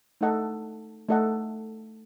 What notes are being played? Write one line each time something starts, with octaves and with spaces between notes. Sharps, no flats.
A3 D#4 A4 D#5 F#5
A3 D#4 A4 D#5 F#5